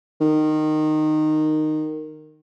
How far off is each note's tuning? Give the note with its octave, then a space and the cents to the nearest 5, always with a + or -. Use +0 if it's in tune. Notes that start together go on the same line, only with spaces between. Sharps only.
D#3 -15